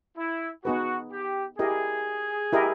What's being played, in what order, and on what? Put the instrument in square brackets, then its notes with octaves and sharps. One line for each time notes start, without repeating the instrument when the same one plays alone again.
[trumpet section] E4
[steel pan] B3 D#4 G#4 B4 [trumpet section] F#4
[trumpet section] G4
[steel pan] E4 G4 A#4 D#5 [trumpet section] G#4
[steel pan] E4 G4 A#4 D#5